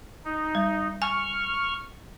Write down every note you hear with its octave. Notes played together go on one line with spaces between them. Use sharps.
D#4
G3
G#5 C#6 F6